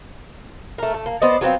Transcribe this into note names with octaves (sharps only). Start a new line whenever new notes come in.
A3 A#4
A3
A#3
B3 C5 D5 D#5
F#3 B3 C4 F4